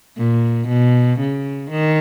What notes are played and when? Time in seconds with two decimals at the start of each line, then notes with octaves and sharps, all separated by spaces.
0.17 A#2
0.68 B2
1.20 C#3
1.71 D#3